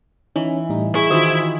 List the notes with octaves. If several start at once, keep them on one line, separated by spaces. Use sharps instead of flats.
E3 C#4 D#4
A2 G3 D#4
E4 G#4 C#6
D#3 E3 F4 F#4 G#4 C5 D#6 E6